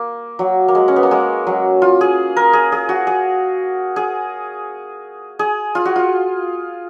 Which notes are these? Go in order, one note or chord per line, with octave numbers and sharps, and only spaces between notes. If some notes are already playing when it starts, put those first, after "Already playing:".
Already playing: A#3
F#3
A#3
G#3
C#4
B3
A#3
G#3
F#3
F4
G#4
A#4
G#4
G#4
F#4
G#4
G#4
G#4
F4
F#4
F4